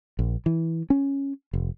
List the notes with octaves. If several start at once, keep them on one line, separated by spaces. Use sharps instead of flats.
A#1
E3
C#4
F1